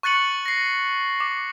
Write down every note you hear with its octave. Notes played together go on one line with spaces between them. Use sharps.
C#6 F#6 A6 C#7 F#7
A#6 C7
D6